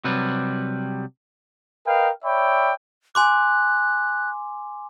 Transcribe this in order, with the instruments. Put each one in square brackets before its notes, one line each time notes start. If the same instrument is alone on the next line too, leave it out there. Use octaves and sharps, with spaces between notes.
[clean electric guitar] C3 F#3 G3 B4
[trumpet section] A#4 B4 D#5 F5 G5
C#5 D5 E5 G5 B5
[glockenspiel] G#5 C6 D6 [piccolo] F#6